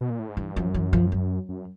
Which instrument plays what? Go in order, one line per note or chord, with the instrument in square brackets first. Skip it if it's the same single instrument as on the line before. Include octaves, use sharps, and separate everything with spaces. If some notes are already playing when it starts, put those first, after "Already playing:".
[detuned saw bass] B2
A#2
A2
G#2
[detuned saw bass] G2 [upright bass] E3
[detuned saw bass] F#2 [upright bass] F3
[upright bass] E3
F3
F#3
[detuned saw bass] F#2